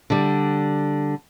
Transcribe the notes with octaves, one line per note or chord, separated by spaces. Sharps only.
D3 G3